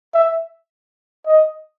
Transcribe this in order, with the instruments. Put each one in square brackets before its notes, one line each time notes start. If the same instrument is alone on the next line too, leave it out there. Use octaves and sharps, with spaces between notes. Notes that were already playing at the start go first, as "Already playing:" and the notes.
[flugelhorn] E5
D#5